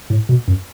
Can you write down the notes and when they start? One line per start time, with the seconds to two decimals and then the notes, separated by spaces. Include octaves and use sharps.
0.10 A2
0.29 B2
0.48 F#2